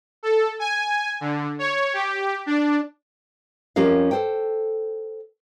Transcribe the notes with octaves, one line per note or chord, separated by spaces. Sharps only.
A4
G#5
D3
C#5
G4
D4
F2 F3 C#4 G4 A#4 F5
A4 C5 G5